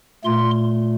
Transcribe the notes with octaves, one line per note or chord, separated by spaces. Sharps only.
A#2 A3 C6